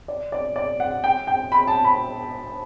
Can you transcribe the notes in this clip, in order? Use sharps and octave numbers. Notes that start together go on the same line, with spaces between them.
D5
D5
D5
F#5
G5
G5
B5
A5
B5